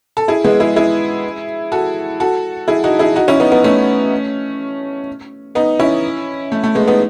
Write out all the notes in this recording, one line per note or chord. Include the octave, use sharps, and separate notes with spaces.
A4
E4 G#4
G#3 B3
E4 G#4
E4 G#4
F#4 A4
F#4 A4
E4 G#4
D#4 F#4
E4 G#4
D#4 F#4
C#4 E4
B3 D#4
B3 D#4
A3 C#4
B3 D#4
C#4 E4
A3
A3
G#3 B3
B3 D#4